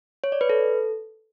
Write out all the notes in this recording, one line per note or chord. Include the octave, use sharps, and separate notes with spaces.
C#5
D5
B4
A4